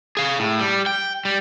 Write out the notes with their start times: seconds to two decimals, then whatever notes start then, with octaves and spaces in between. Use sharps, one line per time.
0.17 G#4 F5
0.39 A2
0.59 G3
0.86 G5
1.25 G3